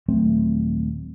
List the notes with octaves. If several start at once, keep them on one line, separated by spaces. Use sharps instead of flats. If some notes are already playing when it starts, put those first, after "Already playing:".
D#1 F#3 A3 C4